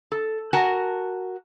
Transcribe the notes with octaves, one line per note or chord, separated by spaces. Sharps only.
A4
F#4 A#4 F#5 G#5 A5